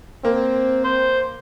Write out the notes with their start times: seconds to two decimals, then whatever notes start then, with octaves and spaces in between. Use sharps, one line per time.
0.25 A#3 C4
0.84 C5